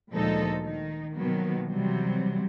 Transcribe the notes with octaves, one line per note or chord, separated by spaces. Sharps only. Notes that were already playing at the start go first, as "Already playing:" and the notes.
D2 A#2 F3 G#3 D#4 A4
D#3 D#4
B2 D#3 F3 F#3 A#3 B3
C3 E3 F#3 G3 C4